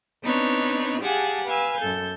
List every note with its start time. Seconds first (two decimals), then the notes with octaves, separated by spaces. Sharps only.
0.22 B3 C4 D4 D#4 B4 C#5
1.00 G4 G#4 F5 F#5 G#5 A5
1.44 B4 F5 G#5 E6
1.78 F#2 A4 G6